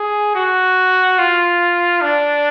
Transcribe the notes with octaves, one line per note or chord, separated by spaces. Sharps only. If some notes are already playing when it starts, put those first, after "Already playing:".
Already playing: G#4
F#4
F4
D4